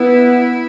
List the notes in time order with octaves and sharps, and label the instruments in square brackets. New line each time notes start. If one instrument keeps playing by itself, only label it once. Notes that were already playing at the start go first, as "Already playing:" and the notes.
Already playing: [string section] B3 [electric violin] E4